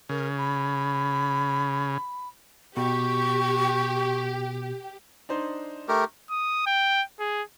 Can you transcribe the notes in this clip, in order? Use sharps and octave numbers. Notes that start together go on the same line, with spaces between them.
C#3 A#4
B5
B2 G4 C#6
D4 D#4 C5
A3 G4 A#4
D#6
G5
G#4